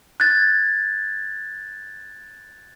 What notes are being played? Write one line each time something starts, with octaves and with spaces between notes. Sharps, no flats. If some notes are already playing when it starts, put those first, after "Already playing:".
F#6 G#6 A6